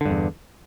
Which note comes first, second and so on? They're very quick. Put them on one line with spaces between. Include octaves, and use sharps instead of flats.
D3 G2 E2